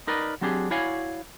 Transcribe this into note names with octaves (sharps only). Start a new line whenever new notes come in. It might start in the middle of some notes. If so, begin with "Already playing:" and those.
D#4 A#4 B4 D5 D#5
F#3 C4 D4 G4 G#4
E4 F#4 C#5 D5 F5 G#5